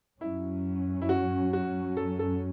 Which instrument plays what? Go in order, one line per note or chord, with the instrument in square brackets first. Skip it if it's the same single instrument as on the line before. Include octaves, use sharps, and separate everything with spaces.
[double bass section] F#2 F#3 C#4 [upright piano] E4
[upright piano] E4
F#4
F#4
A4
A4